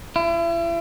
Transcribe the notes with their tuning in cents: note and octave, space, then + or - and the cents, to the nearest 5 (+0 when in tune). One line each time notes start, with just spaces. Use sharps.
E4 +40